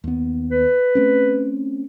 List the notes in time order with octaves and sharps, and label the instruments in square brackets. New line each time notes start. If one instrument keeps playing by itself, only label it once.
[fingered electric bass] D#2 B3
[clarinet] B4
[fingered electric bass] A3 C4 C#4